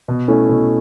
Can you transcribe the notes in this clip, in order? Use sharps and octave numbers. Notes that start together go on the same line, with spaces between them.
B2
A3 C#4 E4
B2